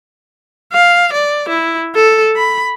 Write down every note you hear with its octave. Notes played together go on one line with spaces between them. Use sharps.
F5
D5
E4
A4
B5